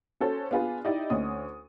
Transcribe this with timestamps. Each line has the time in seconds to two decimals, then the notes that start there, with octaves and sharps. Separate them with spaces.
0.20 C#4 F#4 A4 C5
0.51 B3 D4 F4 G#4 B4
0.85 D#4 E4 G4 D5 D#5
1.10 D2 C#4 D#6